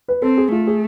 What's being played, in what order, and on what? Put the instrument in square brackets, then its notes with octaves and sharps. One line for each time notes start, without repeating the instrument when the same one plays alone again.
[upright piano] B4
[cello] C4 [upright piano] A4
[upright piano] G#4
[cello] A3 [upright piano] F4
[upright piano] G#4